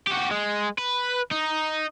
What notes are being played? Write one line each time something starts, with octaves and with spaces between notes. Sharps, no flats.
F#4 G4
G#3
B4
D#4